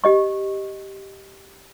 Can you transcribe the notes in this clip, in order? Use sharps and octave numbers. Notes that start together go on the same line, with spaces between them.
G4 D#5 C#6